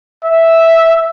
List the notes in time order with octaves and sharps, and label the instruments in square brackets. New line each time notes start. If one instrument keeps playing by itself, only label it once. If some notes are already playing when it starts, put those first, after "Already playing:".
[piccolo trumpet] E5